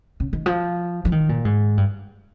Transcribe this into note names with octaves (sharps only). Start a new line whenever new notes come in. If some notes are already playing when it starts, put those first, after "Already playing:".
C#3
D#3
F3
F3
D#3
A#2
G#2
G2